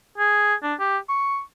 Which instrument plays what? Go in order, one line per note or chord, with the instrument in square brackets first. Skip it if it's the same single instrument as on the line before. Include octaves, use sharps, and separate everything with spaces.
[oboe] G#4
D4
G4
C#6